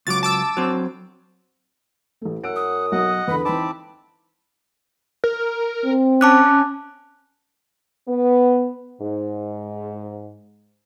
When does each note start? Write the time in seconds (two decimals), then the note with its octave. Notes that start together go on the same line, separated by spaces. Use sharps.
0.07 C#2 F#3 D6 A6
0.23 A5 D6 E6
0.57 F#3 C4
2.22 A1 A3
2.44 F#2 F#5 E6 D7
2.55 D#6
2.92 B1 D#5 F#5
3.28 E2 D3 B4 B5
3.45 E3 C4 D#4 A5 B5 D6
5.24 A#4
5.85 C4
6.21 C#4 A5 D6 F#6
8.08 B3
9.01 G#2